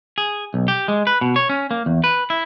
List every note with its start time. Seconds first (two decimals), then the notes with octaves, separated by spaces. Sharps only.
0.18 G#4
0.54 B1
0.68 G4
0.88 G#3
1.07 B4
1.21 B2
1.36 C#5
1.49 C#4
1.71 A#3
1.86 E2
2.04 B4
2.30 E4